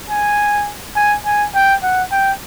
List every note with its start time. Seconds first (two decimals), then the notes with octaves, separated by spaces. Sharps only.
0.10 G#5
0.96 G#5
1.26 G#5
1.55 G5
1.83 F#5
2.12 G5